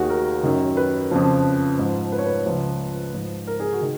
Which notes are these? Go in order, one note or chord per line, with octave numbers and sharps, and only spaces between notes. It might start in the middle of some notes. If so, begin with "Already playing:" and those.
Already playing: D#2 D#3 F#4 G#4
A#4
F#2 D#3
B4
F2 C#3 F3
G#2 F3
B4
C#5
B4
C#2 C#3 F3
G#2 F3
A#4
G#4
F#4
D#3